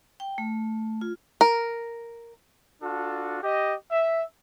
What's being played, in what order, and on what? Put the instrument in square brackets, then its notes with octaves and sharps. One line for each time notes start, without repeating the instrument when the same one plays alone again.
[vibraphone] G5
A3
F4
[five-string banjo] A#4
[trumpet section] D4 F4 F#4 A4
G4 D#5
E5